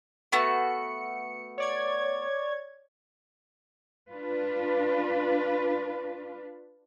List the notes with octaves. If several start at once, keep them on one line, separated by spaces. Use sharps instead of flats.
A3 B3 F#4 C#7
C#5 D5 G#6
D4 F4 B4